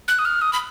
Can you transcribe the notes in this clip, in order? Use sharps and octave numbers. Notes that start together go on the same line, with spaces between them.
F#6
D#6
F6
D#6
B5